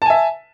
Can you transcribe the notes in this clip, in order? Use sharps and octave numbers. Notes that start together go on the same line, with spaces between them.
E5 G#5 A5